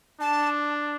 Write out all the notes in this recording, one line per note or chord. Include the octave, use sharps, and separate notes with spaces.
D4 A5